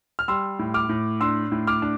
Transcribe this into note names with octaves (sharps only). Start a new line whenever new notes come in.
F6
G3 C6 E6
A2
D6 F6
A2
D4 C6 E6
A2
D6 F6
D4